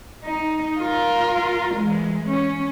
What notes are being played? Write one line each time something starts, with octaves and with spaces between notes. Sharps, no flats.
D#4
F4 A#4
E3 G#3
C#4